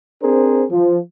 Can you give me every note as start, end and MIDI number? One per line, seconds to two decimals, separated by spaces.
0.23 0.64 60
0.23 0.64 62
0.23 0.64 68
0.23 0.64 70
0.23 0.64 72
0.70 0.99 53